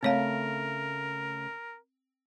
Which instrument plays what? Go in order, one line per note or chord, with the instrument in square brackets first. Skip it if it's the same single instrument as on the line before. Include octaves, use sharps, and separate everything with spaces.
[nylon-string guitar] C#3 A3 A5 [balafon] C4 C#5 F5 [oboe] A#4